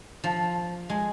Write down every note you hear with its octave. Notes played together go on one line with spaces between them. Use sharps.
F3
G#3